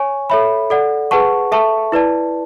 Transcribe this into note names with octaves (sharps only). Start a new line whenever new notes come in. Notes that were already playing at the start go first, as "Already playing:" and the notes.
Already playing: C#5 G#5 C#6
A4 C#5 E5 B5
A4 D5 F#5
G#4 B4 F#5 A5 C#6
A4 E5 A5 C#6
E4 B4 D5 A5